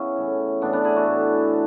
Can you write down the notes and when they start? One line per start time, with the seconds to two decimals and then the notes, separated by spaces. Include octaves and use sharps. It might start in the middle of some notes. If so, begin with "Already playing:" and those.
Already playing: C#3 B3 C#4 E4
0.16 A2 E3
0.62 A2 E3 B3 D4
0.73 B3 D4
0.84 E4 G#4
0.96 F#4 A4
1.07 A2 E3